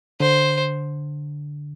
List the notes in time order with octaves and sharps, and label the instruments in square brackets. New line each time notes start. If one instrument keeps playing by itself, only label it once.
[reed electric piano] D3 [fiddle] C5